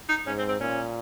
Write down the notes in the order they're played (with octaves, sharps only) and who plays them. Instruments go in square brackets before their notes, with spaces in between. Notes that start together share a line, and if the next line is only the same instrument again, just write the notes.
[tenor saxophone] D#4
[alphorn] G#2 [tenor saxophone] C#4
[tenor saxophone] C4
C4
[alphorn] A#2 [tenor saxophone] C#4